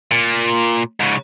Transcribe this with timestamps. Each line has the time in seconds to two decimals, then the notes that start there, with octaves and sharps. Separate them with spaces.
0.12 A#2
1.01 G#2 C#3